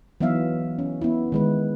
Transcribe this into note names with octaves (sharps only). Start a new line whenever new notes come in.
E3 F#3 B3 D#4 E5 F5
C#4
B3 E4
D#3 G#3 B4